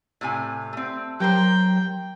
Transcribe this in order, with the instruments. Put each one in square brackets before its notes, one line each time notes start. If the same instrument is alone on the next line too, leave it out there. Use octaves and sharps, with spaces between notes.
[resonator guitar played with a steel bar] A2 C3 G#5
A3 C4
[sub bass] F#3 [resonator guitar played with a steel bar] G4 A#4 C5 [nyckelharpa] G5